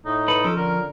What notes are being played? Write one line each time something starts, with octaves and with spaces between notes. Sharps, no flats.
A2 D#4
A4 B4
F3 C#4 A4
D3 A#4